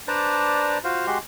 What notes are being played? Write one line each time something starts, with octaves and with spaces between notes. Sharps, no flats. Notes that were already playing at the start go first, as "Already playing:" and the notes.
D4 B4 C5 D5 A5 A#5
F4 F#4 C5 F5
G#3 F#4 G4 C6